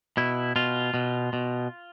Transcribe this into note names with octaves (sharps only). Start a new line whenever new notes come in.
B2 E4
B2 F4
B2
B2